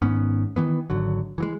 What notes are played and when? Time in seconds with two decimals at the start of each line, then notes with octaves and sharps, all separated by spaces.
0.02 G#1 G#2 B3 C#4
0.56 D#3 E3 B3
0.90 G#1 D3 F#3
1.38 E3 F#3 G#3